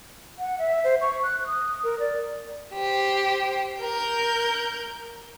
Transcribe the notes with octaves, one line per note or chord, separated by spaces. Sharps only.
F#5
E5
C5
C#6
F#6
D#6
A#4
D5
G4 C5
A#4 G6